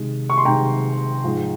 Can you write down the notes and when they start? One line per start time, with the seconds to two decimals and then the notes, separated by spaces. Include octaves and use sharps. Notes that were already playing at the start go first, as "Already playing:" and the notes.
Already playing: C3 D#3 G#3
0.30 C#6
0.37 C6
0.45 C3 D#3 G#3 G5 A#5
1.24 G#2 F3 G#3